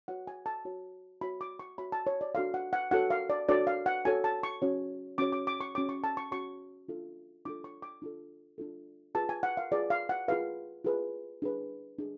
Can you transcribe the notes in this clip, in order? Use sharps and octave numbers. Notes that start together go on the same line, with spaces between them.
F#4 C#5 F#5
G#5
A5
F#4 C#5
F#4 C#5 B5
D6
C#6
F#4 C#5 B5
A5
C#5
D5
D4 F#4 A4 C#5 F5
F#5
F#5
D4 F#4 A4 C#5 F#5
F5
D5
D4 F#4 A4 C#5 D5
F5
F#5
D4 F#4 A4 C#5 G#5
A5
C#6
C#4 F#4 C#5
C#4 F#4 C#5 D6
D6
D6
C#6
C#4 F#4 C#5 D6
C#6
A5
C#6
C#4 F#4 C#5 C#6
D4 F4 A4
D4 F4 A4 D6
C#6
D6
D4 F4 A4
D4 F4 A4
F4 G#4 B4 A5
G#5
F#5
F5
F4 G#4 B4 D5
F5
F#5
F4 G#4 B4 F5
F4 G#4 B4
D4 G#4 B4
D4 G#4